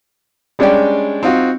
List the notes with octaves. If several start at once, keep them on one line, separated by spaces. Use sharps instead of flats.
G3 G#3 C#4 D4 D5 G5
C4 D#4 F4 F#4